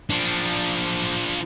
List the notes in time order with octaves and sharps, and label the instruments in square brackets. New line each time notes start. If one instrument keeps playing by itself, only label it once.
[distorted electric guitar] F3 D4